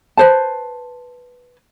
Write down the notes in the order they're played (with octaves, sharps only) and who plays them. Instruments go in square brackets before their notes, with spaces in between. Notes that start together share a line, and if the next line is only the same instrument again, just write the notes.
[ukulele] B4 C5 A5